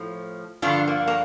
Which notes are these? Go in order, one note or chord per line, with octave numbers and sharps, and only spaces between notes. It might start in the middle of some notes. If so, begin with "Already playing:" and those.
Already playing: A2 F3
G2 D3 F3 D4 F4
A#3
A#3